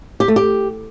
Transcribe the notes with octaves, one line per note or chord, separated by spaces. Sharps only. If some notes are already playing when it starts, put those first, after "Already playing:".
G4
A3
G4